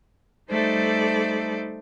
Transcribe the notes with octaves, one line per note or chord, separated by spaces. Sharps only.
G3 A3 D#4 A4 C5 D5